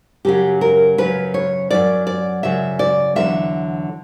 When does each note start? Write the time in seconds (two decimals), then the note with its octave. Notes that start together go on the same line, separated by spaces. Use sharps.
0.25 F#2 C#3 F#3 G4
0.61 A#4
0.98 F#2 C#3 F#3 B4
1.34 C#5
1.70 F#2 C#3 F#3 D5
2.07 D5
2.43 F#2 C#3 F#3 E5
2.79 D5
3.16 E2 D3 F#3 E5